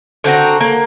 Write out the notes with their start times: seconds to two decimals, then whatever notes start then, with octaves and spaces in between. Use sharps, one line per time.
0.24 D3 C4 F#4 A#5
0.60 A#3